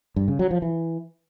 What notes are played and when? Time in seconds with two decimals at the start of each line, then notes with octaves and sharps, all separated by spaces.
0.16 G2
0.28 C#3
0.39 F#3
0.51 F3
0.62 E3